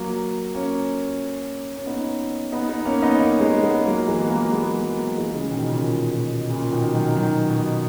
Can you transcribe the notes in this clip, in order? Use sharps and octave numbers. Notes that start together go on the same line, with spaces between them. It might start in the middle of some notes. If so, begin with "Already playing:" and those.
Already playing: F#3 A#3
A#3 C#4
C#4
B3 D#4
B3 D#4
B3 D#4
A#3 C#4
B3 D#4
A#3 C#4
G#3 B3
G#3 B3
F#3 A#3
E3 G#3
B3
F#3 A#3
G#3 B3
F#3 A#3
E3 G#3
C#3 E3
B2 D#3
A#2 C#3
A#2
B2
A#2 C#3
B2 D#3
D#3 F#3
D#3 F#3
B2